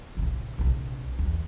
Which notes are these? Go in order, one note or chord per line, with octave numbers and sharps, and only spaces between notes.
A1 C3
A#1 C3
E2